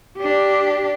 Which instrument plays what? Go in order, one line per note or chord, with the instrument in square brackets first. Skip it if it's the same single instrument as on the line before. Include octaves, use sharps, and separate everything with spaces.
[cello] D4 G4